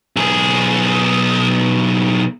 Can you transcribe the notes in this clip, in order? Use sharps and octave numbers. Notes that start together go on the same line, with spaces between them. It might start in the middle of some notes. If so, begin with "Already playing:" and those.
B1 G#4